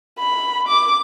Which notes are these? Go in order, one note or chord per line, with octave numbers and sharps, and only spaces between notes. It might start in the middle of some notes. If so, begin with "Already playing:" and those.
B5
D6